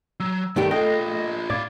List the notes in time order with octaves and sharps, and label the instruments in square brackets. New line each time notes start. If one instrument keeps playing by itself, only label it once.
[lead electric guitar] F#3 [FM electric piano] E6
[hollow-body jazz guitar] G2 D#3 G4 [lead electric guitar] A3 A4
[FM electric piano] A3 D#5 A#6 [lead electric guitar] D4 F4 [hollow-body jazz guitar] G5
[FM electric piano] A2 D6 G#6 [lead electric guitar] E4 F5 [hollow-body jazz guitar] D5